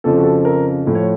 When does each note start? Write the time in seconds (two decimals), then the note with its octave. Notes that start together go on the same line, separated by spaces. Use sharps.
0.04 F2 C#3 F3 A4
0.18 F#4
0.24 A4
0.45 A#4
0.85 A2 F3
0.95 C#5